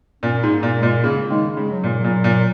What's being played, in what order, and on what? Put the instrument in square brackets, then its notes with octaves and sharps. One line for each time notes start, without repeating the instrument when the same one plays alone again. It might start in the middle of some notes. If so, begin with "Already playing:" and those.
[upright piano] A#2 [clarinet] C#4
[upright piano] G#2
[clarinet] A#3
[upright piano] A#2
[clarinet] G#3
[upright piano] A#2
[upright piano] C#3 [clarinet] A#3
[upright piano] D#3 [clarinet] G#3
[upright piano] C#3 [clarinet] G#3
[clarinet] F#3
[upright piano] A#2
[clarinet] F#3
[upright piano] A#2
A#2